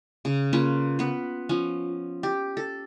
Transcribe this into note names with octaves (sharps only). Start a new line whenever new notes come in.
C#3
A#3 C#4 F4 B4
B3 B4
F3 C#4
G4
A4